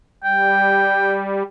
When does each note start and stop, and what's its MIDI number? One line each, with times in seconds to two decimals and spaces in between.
0.24 1.43 55
0.24 1.19 79